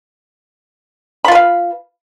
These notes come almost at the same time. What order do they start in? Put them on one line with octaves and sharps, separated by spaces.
B5 F4 B4 F5